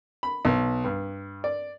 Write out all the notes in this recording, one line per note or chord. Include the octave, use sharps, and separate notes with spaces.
B5
B1
G2
D5